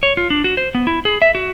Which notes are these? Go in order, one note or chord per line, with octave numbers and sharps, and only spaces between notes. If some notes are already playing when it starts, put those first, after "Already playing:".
C#5
F4
D4
F#4
C5
B3
E4
G#4
E5
F#4